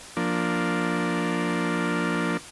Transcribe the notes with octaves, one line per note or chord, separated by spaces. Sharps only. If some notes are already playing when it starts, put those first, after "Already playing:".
F3 A#3 D4